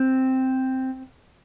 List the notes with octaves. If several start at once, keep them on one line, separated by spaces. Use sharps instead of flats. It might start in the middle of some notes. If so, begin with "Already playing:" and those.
Already playing: C4